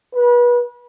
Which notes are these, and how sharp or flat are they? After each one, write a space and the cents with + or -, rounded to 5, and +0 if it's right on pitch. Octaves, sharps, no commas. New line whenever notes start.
B4 -30